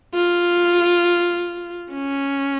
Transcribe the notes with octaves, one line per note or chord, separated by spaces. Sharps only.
F4
C#4